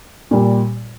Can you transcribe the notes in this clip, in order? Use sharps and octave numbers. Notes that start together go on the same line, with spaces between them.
A#2 G3